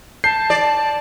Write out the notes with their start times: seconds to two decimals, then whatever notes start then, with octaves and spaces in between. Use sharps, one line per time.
0.24 A5 G6 C7
0.50 D5